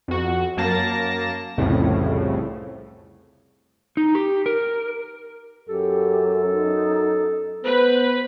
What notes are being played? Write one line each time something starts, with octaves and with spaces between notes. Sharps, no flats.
F2 F#4
F#2 A#3 A5 A#6
C2 F2 A2 C#3
D#4
G4
A#4
F#2 G4 A4
D#4
B3 B4 C5